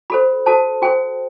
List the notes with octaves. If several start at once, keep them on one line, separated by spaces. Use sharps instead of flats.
F#4 A4 C5 B5
F#4 A4 C5 A5
F#4 A4 C5 G5